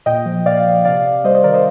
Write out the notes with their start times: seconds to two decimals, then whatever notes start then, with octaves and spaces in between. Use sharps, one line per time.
0.06 A#2 D#5 G5
0.26 F3
0.46 A#2 D5 F5
0.66 F3
0.85 C3 D5 F5
1.05 C3
1.24 G3 C5 D#5
1.35 C5 D#5
1.44 D#3 A#4 D5
1.54 C5 D#5